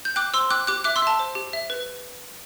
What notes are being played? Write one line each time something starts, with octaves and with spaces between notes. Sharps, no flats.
G6
G5 D6 F#6
C5 C6 E6
G5 D6 F#6
G4 D6 F#6
E5 D6 F#6
C6 E6
E5 A5
C5
G4
E5
B4